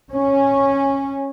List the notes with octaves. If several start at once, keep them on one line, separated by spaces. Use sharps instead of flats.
C#4